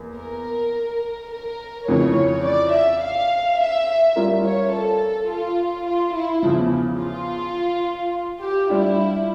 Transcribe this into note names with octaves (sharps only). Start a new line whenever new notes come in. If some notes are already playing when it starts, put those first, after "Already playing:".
Already playing: E2 A#3
A#4
A#4
F2 C#3 E3 C#5
D5
E5
F5
E5
G3 C#4 F4 A#4
C#5
A4
F4
F4
E4
E2 C#3 F3
F4
G4
G3 D4 E4 F4